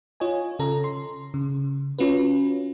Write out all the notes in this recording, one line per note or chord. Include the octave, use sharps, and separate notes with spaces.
F4 C#5 D#5 G#5
C#3 A4 A#5
C6
C#3
C#4 F4 F#4 B4